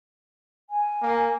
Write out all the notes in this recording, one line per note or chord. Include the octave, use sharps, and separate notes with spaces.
G#5
A#3